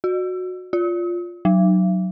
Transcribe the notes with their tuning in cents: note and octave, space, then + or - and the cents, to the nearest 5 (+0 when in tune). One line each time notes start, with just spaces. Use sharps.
F#4 -15
F4 +5
F#3 +5